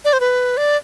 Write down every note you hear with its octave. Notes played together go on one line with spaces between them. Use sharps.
D5
C5
B4
D5